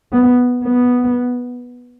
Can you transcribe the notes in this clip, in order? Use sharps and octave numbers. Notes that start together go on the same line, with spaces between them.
B3
B3